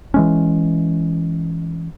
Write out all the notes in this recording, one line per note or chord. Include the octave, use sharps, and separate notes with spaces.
E3 G#3 C#4